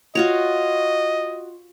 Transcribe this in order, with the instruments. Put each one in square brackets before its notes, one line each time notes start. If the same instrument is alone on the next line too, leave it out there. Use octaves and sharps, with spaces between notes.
[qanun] F4 F#4 C#5 [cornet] D#5